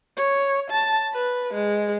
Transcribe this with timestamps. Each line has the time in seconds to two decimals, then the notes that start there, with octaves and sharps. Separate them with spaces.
0.17 C#5
0.71 A5
1.13 B4
1.54 G#3